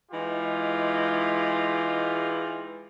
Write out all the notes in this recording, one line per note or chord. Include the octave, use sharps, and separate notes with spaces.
E3 G#3 D#4 F4 G4